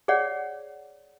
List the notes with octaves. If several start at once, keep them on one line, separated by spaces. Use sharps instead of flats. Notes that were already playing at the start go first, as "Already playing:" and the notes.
G#4 C#5 D5 F#5